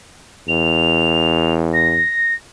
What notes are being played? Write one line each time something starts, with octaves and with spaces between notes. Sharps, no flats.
E2 F7
A#6